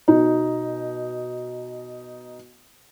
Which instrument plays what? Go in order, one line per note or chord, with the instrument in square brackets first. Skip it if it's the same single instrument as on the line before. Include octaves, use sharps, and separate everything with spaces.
[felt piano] B2 D#4